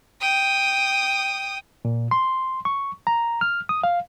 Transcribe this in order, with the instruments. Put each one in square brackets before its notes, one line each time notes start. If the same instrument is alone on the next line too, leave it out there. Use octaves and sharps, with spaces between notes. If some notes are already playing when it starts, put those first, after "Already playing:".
[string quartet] G5 D#6
[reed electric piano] A#2
C6
C#6
A#5
F6
D#6
F5